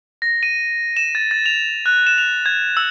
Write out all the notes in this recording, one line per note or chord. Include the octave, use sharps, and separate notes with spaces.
A#6
D#7
E7
A6
A6
F7
F#6
E7
F7
G#6
E6